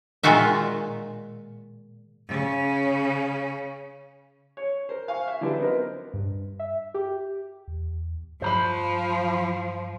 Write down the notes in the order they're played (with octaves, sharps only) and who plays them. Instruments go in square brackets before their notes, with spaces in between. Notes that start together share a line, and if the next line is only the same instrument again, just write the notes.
[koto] A#2 D#3 G#3 F4 F#4 E5
[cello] C#3 C#4
[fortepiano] C#5
A#4 C5
F5 G#5 C#6
E5
D3 F#3 D4 E4 G4 B4
B3 C4 D#4 A#4 B4
[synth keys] G2
E5
G4
[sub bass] E2
[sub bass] G2 [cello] F3 [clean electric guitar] C5 A#5 B5